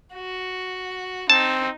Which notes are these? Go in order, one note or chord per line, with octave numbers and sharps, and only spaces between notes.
F#4
C4 D#4 A5